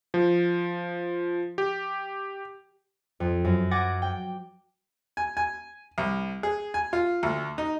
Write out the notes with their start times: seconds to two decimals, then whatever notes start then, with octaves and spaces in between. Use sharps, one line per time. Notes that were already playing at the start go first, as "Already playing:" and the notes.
0.14 F3
1.58 G4
3.20 F2
3.45 F#2
3.71 F#5 G#5 D6 A6 A#6
4.02 G5
5.17 G#5
5.37 G#5
5.98 C2
6.43 G#4
6.74 G#5
6.93 F4
7.23 D2
7.58 D#4